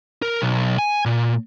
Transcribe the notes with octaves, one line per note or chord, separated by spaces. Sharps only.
A#4
B1
G#5
A#2